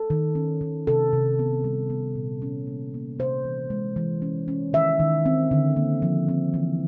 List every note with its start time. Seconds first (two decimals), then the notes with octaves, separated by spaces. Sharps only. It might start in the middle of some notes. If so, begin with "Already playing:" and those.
Already playing: A4
0.10 D#3
0.35 C#4
0.61 D#3
0.87 C3 A4
1.13 C3
1.39 B3
1.64 G3
1.90 B3
2.15 A#2
2.42 C#4
2.67 A#3
2.94 A#3
3.19 C3 C5
3.45 E3
3.70 G#3
3.96 E3
4.22 C#4
4.48 C#4
4.73 D#3 E5
5.00 D#3
5.26 C4
5.51 D3
5.76 A#3
6.02 F3
6.28 C4
6.54 E3